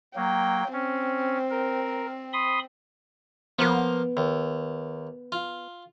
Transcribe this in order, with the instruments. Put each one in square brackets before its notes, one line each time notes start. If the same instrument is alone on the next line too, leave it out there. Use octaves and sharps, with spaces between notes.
[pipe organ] F#3 A#3 [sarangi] G5
[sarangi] C4 [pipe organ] C#4
[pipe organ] A#4
B5 C6 D#6
[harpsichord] F3 A#3 F4 [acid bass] B3
[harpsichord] D#2
F4